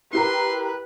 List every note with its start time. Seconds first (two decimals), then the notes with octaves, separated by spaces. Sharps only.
0.13 E4 G4 A#4 B4 C6